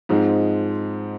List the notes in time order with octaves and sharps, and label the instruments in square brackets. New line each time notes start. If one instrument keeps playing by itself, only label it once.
[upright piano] G#2 F3 G#3 C4 D#4